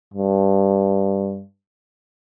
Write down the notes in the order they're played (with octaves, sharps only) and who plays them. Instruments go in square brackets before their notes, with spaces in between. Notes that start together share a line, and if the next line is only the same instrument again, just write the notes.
[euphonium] G2